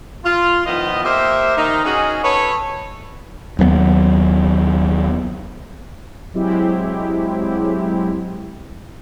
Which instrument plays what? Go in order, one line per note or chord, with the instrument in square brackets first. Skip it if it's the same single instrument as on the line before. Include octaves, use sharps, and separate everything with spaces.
[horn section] F4
D#3 F3 B3 E4 D#5
A#3 G4 C5 E5
D#3 D#4
C#4 D#4 F#4 G#4
A4 B4 C#5
[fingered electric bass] D#2 F#3 A3 B3
[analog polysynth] F#3 G#3 C4 E4 G4